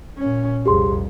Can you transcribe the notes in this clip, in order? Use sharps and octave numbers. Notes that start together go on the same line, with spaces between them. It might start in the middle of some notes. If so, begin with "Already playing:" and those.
A#2 C#4
C2 F2 G4 G#4 C6